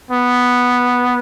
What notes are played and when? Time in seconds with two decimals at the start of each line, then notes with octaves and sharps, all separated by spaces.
0.11 B3